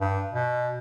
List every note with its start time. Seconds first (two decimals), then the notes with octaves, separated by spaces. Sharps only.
0.01 G2
0.34 B2